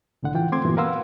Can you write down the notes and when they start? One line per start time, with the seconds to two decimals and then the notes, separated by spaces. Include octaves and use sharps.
0.23 C2 A2 D3 F#5
0.35 E3 F4 G5
0.52 A3 C4 C6 D6 G#6
0.65 G2 A#2 E3 A#3 B3 F#4
0.77 A#4 B4 F5 F#5 C6 E6